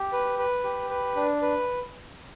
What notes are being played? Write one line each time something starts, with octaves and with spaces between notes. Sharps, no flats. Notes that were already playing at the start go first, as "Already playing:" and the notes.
Already playing: G4
B4
B4
G4
B4
D4
B4